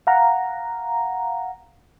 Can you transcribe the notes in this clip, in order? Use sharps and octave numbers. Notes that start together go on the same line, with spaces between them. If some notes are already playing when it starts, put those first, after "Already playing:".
F5 F#5 A#5